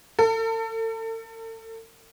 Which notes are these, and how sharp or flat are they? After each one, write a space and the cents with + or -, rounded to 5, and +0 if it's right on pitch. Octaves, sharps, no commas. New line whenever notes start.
A4 +40